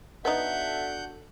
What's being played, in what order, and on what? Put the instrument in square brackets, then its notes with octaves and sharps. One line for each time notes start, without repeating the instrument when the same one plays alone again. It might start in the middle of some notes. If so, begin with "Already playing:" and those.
[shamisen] B3 D#4 [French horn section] D4 F#4 A4 [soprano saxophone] E5 [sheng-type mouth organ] F#5 G6